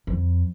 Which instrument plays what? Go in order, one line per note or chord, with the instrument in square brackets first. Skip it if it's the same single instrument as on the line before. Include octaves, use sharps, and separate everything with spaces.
[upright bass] F2